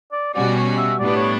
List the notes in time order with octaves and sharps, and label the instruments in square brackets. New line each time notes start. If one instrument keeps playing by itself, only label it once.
[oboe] D5
[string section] B2 G3 C#4 F#4 [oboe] D5
[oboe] C#5
E5
[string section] A2 G3 B3 D4 [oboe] D5
[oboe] C#5